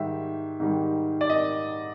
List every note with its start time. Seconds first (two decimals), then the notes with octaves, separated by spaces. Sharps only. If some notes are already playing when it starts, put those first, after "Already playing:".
Already playing: G#2 D#3 G3 E5
0.60 G#2 D#3 G3
1.21 D5
1.30 D#5